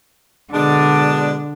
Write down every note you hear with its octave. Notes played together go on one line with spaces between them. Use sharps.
B2 D3 G#3 D4